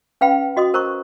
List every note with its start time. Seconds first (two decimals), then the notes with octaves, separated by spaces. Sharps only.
0.21 C#4 B4 F5 G5 B5
0.57 F#4 D#5 C6 D#6
0.74 A#4 C5 A#5 C#6